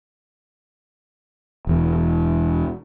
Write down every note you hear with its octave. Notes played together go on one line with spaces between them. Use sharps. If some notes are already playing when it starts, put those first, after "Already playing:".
E1 E2